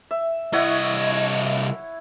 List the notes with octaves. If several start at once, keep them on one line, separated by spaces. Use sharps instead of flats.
E5
C2 E4 C#5 D#5 F#5